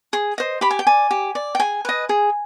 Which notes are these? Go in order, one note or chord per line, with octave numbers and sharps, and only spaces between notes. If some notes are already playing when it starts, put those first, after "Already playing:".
G#4
C5 D#5
G4 B5
G#5
G5
D5 G#5
G4
D5
G5
G#4 G#5
B4 D#5
G#4